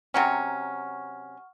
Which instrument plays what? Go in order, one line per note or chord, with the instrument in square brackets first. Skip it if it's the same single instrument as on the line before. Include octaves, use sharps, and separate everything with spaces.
[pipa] C3 F#3 C#4 [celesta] F#5 C#6 F6